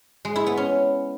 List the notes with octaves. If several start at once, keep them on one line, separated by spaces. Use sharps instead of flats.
G#3
E4
B3
C#4